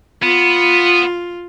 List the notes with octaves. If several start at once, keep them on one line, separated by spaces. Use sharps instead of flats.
B3 F4